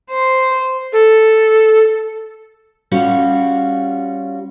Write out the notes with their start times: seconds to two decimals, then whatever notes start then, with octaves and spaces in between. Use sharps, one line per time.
0.10 C5
0.93 A4
2.92 G3 C#4 F4 F#4